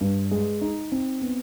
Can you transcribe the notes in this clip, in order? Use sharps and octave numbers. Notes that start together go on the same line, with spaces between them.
G2
G#3
D#4
C4
B3